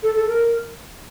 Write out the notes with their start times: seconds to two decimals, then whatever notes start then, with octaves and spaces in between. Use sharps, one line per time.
0.03 A4
0.16 A4
0.27 A#4